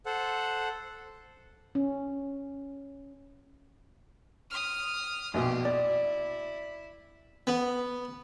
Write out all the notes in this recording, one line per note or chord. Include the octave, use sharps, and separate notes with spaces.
A4 C5 F#5
C#4
D#6 F6
A#1 B2 F4 G4
E4 D5
B3